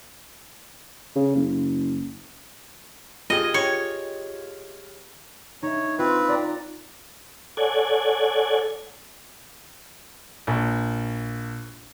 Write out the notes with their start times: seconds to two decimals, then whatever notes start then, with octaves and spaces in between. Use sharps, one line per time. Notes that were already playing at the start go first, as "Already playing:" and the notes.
1.15 C#3
1.35 F#1
3.30 F4 G4 G#4 D#5
3.54 C#5
5.63 D#4 C#5 E5
5.99 C4 F4 B4
6.29 D5 A#5
7.57 A4 C#5 D5 F#5 G#5 G#6
10.47 A#1